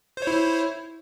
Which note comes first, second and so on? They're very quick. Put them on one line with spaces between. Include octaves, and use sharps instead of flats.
C5 C#5 E4